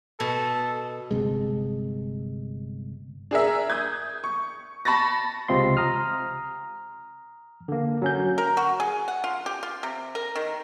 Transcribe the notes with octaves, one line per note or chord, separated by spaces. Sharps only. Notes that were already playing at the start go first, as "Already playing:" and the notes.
B2 A4
G1 E2 C3 G#3
D4 G#4 A#4 E5
D#6 G6 G#6
C#6
A5 B5 C#6 A6 A#6
C#2 C3 C4 F4 D#5 C6
A#5 D#6 F6
D3 A#3
F#3 C#4 G6
A#4
F#4
G#4
F#5
F4
G4
F4
C3
A#4
D#3